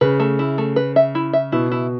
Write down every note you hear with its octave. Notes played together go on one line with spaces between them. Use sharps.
C#3 B4
A3
E4
A3
B4
E5
E4
E5
B2 E4
E4